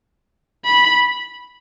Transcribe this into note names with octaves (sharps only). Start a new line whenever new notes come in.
B5